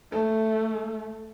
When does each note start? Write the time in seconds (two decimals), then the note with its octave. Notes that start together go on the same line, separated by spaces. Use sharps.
0.12 A3 A4